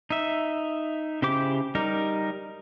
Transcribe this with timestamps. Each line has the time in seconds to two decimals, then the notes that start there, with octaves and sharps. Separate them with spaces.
0.10 D#4 E5
1.22 C#3 E4 G4 C5 D6
1.75 G3 D#4 A#4